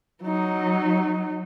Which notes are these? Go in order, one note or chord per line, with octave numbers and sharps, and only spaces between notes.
F#3 D#4